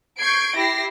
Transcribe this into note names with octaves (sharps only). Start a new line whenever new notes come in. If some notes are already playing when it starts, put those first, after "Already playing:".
C#6 G6 G#6 C7 D7
E4 G4 A#6 C7